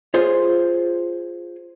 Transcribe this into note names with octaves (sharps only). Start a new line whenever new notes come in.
F4 G#4 C5 C#5